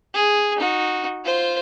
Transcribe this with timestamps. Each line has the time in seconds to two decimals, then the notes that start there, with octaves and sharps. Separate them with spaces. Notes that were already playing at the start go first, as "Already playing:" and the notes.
0.14 G#4
0.57 D#4 F#4
1.25 F4 C5